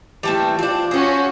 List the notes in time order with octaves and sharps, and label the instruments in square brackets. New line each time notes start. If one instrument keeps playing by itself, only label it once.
[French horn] E3 [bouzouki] G3 A3 C4
[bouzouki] C4 D4 [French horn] F4
[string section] C#4 F#4 [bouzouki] G#4 C5